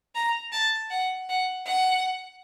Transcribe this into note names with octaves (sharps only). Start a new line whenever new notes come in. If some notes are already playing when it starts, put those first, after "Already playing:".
A#5
A5
F#5
F#5
F#5